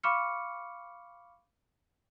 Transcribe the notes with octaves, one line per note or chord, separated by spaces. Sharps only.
F5 B5 C#6 D6 F6 C#7